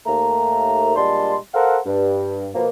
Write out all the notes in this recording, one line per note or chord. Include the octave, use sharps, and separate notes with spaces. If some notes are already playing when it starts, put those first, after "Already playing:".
D#2 A3 A#3 A#5
A#2 G3 G#3 D4 A5 C6
A4 A#4 C5 F5 F#5
G2
B2 F3 A#3